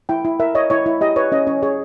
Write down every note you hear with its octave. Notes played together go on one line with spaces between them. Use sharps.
E4 G5
E4
A#4 E5
C#5 D#5
E4 C#5
E4
G4 D#5
B4 C#5
C#4 D#5
C#4 C#5
G#4 C#5